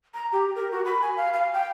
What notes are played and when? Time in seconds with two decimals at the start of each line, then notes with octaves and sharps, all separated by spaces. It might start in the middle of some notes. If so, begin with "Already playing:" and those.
0.14 A#5
0.33 G4
0.56 A#4
0.72 F#4
0.85 B5
1.02 G#5
1.17 F5
1.33 F5
1.54 G5